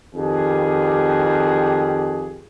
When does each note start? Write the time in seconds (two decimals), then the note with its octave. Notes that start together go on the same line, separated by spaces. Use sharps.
0.15 F2 D#3 G4 G#4